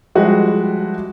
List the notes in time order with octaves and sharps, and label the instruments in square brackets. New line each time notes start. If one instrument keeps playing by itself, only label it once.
[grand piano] F3 G3 G#3 E4 F#4 G4